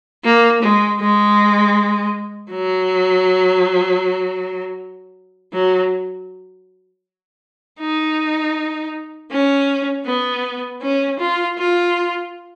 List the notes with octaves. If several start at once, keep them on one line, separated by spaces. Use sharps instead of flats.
A#3
G#3
G#3
F#3
F#3
D#4
C#4
B3
C#4
F4
F4